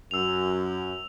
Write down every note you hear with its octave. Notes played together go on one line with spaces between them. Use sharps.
F#2 E6 F7